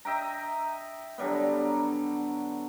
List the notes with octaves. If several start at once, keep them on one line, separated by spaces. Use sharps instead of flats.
D#5 E5 G5 A#5
D3 F#3 G3 B3